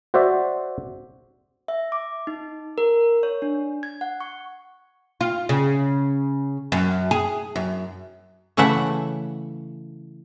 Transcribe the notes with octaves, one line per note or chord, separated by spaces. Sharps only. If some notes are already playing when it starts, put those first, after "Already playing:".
F#4 C5 D5 E5
E5
D6
D#4
A#4
C#5
D4
G#6
F#5
C#6
F4
C#3
F#2
G#4
F#2
C#3 E3 A3 E5 F#5